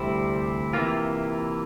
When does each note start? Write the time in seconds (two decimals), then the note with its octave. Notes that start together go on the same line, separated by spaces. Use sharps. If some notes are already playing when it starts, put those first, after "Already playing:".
Already playing: D2 C3 G3 C4 E4
0.73 C3 E3 A#3 F4